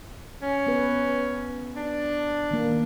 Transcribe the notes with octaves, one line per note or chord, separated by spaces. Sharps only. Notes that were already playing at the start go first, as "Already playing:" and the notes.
C#4
B3 B4
D4
D#3 A#3